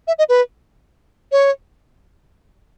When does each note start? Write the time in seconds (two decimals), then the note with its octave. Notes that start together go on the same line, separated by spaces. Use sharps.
0.07 E5
0.19 D#5
0.29 B4
1.32 C#5